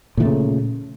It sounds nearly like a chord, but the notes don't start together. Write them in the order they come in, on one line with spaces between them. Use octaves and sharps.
A#2 E3 A3 C#3